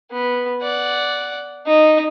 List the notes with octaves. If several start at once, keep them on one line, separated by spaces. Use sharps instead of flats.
B3
D5 F#5
D#4